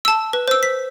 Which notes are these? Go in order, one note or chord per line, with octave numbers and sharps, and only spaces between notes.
A5 E6
B4
C5 E6
B6